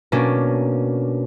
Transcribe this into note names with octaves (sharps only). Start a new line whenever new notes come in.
B2 A#3 C#4 D4